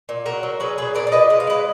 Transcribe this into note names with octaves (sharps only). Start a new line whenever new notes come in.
A#2
F#3 F#4 A#4
F#3
F#3 G#4 B4
A#2 G#4 B4
A#2 A#4 D5
D5
A#2 B4 D#5
G#3 D#5
F5
G#3 B4 D#5